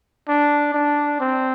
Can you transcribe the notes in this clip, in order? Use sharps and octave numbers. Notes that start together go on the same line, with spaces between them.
D4
D4
C4